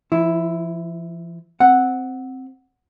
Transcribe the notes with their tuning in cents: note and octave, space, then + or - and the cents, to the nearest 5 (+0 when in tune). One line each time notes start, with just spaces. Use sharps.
F3 -40 E4 +0
C4 +0 F#5 +0